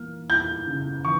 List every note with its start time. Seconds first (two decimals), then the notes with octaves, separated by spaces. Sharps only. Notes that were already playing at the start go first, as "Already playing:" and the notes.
Already playing: E3 A#3 F6
0.29 E4 G6
0.67 C#3
1.05 E3 C#6